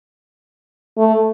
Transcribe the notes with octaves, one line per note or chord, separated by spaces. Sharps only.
A3